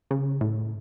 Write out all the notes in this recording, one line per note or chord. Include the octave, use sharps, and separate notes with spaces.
C#3
A2